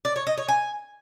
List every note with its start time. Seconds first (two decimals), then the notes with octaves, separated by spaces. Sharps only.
0.05 D5
0.16 C#5
0.27 D#5
0.38 C#5
0.48 G#5